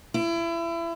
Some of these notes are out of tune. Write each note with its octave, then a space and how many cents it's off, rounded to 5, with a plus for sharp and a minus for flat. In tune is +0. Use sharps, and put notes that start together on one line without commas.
E4 +30